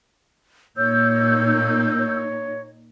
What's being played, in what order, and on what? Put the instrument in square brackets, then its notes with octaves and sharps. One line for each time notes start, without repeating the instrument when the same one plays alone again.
[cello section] A#2 A#3 D#4 [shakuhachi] C#5 [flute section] E6 G6
[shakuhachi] C#5